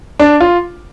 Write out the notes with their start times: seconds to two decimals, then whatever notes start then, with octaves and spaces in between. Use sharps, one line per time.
0.19 D4
0.41 F4